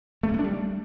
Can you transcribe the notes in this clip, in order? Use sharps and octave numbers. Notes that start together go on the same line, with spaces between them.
A3
A#3
B3
D4
G3